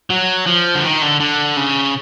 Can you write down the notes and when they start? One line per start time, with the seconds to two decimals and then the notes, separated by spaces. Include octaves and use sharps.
0.10 F#3
0.46 F3
0.75 D3
0.84 D#3
1.02 D3
1.20 D3
1.57 C#3